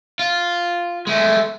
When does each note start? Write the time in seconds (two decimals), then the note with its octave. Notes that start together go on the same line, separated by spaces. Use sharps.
0.19 F4
1.07 G#3 A3